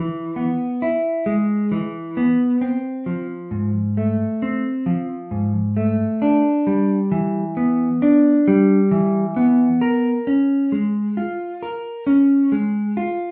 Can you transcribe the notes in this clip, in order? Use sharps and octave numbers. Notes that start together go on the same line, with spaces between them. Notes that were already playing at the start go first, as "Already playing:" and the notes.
Already playing: E3
B3
E4
G#3
E3
B3
C4
F3
G#2
A3
C4
F3
G#2
A3
D4
G3
E3
B3
D4
G3
E3
B3
A#4
C#4
G#3
F4
A#4
C#4
G#3
F4